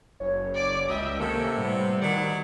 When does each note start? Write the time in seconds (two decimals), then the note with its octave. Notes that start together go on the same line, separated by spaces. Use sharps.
0.20 F#1 C#5
0.54 D5 D6
0.89 C#2 G3 D4 D#5 E5 G5
1.20 C3 D#3 A#3 C#4 A4
1.57 A2 G3 B3
2.01 D#3 F#3 D5 F#5